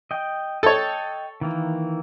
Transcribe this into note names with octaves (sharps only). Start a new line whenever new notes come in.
D#5 G5
A4 C#5 D#5 G5 A5
D#3 E3 A#3